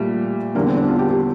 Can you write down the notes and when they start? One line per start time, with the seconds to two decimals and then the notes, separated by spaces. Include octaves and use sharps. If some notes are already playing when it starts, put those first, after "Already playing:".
Already playing: A#2 G3 A3
0.55 E2 D3 G3 A#3
0.67 C4
0.77 D4
0.88 F4
0.99 G4
1.10 G4